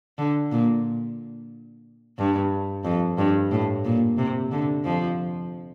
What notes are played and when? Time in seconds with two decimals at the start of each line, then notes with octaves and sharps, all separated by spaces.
0.18 D3
0.52 A#2
2.18 G2
2.85 F2
3.18 G2
3.51 A2
3.85 A#2
4.18 C3
4.51 D3
4.84 F2 F3